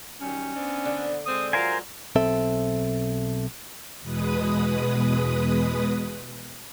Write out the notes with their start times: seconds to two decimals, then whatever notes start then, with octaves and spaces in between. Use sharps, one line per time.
0.21 D#3 F#3 G3 C#4
0.54 B3 C4 D4
0.85 D3
1.26 G#3 C4 D#6
1.53 F#3 G#3 F4 A#4 C5 F5 G#5
2.16 B1 C4 A4 E5
4.01 E2 B2 G#3 B4 D#6